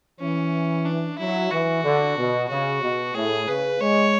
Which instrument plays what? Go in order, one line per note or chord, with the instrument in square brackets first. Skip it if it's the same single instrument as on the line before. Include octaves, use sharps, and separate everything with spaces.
[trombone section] E3 [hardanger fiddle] C#4
[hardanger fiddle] D4
[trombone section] F#3 [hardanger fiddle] E4
[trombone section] E3 [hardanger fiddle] F#4
[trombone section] D3
B2
[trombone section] C#3 [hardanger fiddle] F#4
[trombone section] B2
[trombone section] A2 [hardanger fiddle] G#4
[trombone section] C#3 [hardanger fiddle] B4
[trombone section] G#3 [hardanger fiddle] C#5